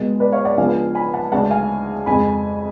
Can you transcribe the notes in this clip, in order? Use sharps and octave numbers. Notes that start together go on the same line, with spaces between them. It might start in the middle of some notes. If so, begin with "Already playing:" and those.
Already playing: C#2 B2 G#3
B4 D5
C#5 F5
D5 F#5
C#2 C#3 F3 B3 D4 F5 G#5
G#5 B5
F#5 A5
D2 C#3 G#3 D4 F#5 A5
F5 G#5
F2 C#3 G#3 G#5 B5